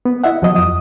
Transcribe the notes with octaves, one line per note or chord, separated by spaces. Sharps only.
B3
E4 D#5 E5 F#5
D2 F3 F#3 D#5 D#6
F2 D#6